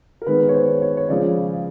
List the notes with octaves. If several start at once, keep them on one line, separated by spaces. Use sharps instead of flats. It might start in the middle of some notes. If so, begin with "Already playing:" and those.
A#4
D#3 G#3 B3 B4
C#5
C5
C#5
C#5
C#3 F3 G#3 D5